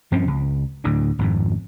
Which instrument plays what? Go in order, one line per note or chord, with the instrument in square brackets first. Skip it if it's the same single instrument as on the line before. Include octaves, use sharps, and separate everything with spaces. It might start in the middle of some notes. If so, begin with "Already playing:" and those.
[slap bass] G2 F3 C4 C#4
C#2
D2 A2 D3
G#1 F2 G#2